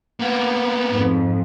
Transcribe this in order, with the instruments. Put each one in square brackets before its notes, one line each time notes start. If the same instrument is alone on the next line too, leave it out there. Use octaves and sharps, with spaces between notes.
[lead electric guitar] A#3 B3
[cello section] F2 G#2